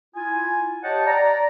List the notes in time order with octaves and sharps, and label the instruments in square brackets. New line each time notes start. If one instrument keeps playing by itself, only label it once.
[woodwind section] E4 F4 G#5
G4 C#5 D#5 F#5 G5 A5
D5 A#5